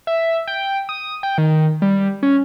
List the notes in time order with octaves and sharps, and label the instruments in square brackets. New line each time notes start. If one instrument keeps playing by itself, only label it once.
[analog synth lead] E5
G5
D#6
G5
D#3
G3
C#4